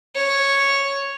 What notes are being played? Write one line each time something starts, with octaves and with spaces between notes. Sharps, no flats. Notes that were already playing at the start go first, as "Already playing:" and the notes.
C#5